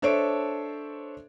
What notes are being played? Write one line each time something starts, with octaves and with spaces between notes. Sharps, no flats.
D4 A4 C5 C#5 E5 D7